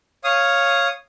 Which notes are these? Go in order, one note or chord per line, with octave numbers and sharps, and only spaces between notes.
C#5 F5 D#6